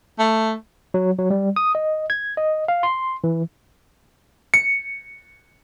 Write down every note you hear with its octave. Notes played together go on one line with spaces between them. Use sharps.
A3
F#3
F#3
G3
D#6
D#5
G#6
D#5
F5
C6
E3
C#7